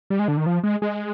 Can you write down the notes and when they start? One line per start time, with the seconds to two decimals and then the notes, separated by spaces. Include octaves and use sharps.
0.10 G3
0.19 G#3
0.28 D3
0.37 D#3
0.46 F3
0.63 G#3
0.82 G#3